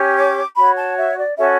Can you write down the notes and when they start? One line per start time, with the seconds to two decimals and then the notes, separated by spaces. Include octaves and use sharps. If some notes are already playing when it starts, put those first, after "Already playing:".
Already playing: C#4 G4 C#5
0.15 D6
0.56 F#4 C#5 B5
0.77 A5
0.97 E5
1.17 D5
1.38 C#4 F#4 A4 E5